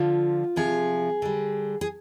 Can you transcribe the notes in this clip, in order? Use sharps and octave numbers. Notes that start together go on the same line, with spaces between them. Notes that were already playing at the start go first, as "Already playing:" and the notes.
Already playing: D3 F3 F4
C3 F3 G#4
D3 G3
G#4